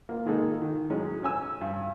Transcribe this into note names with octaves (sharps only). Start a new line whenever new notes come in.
A#3 F4
D#3 G#3 A#3 D#4 A4
D#3
A2 F#3 G#3 C#4
C#4 G#5 E6
G2